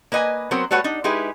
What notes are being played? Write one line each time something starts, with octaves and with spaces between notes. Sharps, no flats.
A#3 B4 D#5 F#5 G#5
F#3 B3 C4 A#4 C5
G3 A3 F#4 B4 C#5 F#5
D4 D#4
G#3 D#4 E4 G4 G#4 B4